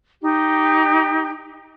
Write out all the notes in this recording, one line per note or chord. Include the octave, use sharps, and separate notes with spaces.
D#4 G4